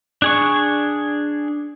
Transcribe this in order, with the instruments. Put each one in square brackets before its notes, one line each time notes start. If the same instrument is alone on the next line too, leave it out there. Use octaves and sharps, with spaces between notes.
[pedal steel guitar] D4 G#4 C#6